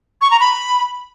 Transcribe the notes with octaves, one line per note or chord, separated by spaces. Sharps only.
C#6
A#5
B5